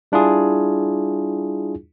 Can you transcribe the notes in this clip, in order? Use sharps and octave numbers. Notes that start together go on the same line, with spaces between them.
G3 D4 E4 F4 G#4